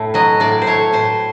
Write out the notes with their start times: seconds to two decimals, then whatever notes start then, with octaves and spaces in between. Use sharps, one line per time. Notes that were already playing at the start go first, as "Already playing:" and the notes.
Already playing: A2 A3
0.14 F#3 D#5
0.40 A2 D5
0.62 C5
0.67 A3 C#5
0.93 A2 C5